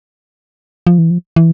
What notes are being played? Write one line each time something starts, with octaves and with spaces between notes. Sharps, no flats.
F3
E3
F3
E3